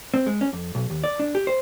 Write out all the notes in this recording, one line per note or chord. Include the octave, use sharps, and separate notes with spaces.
C4
G#3
C#4
F2
B1
D#2
D5
D4
G4
C5